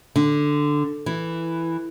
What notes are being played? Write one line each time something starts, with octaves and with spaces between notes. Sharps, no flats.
D3
E3